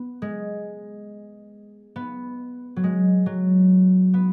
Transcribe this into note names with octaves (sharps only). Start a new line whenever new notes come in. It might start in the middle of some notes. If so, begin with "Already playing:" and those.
Already playing: B3
G#3
B3
F#3
G#3
F#3
B3